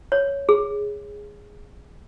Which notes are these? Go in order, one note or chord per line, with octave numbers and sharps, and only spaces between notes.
C#5
G#4